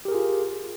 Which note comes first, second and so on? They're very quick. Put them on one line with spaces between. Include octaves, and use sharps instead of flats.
G4 A#4 G#4 F4